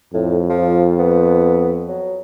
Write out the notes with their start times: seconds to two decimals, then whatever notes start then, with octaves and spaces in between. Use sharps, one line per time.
0.13 F2 A2
0.50 F3
0.99 B3
1.88 F#3